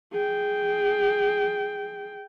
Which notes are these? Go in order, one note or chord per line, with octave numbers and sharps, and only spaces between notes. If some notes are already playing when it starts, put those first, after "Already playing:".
G#4 G5